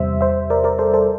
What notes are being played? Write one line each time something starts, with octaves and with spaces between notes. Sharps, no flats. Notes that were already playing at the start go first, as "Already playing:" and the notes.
Already playing: E2 C3 G3 C5 E5
C5 E5
A#4 D5
A#4 D5
A4 C5
A4 C5